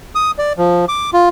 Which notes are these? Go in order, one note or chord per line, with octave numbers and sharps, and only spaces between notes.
D#6
D5
F3
D6
F4